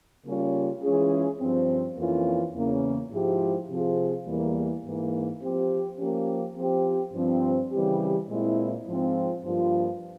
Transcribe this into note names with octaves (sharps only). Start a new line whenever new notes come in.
C#3 G3 A#3 C#4 F4
E3 G#3 C#4 F4 G#4
G2 F3 C4
F2 E3 A#3 C#4 F4
E2 C#3 E3 A#3 C#4
G#2 F3 G#3 E4 G4
C3 F3 C4 F4 G#4
E2 E3 G3 A#3
G#2 E3 A#3
F3 C4 G4
F3 A#3 C#4 G4
F3 C4 G4
G2 F3 C4
C#3 E3 G3 C4 G4
A#2 G#3 C4 E4
G#2 F3 G#3 C4 F4
G2 F3 A#3 F4